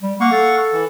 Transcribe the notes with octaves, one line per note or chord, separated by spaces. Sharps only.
G3
A#3 F5 F#5 C#6
A4
E3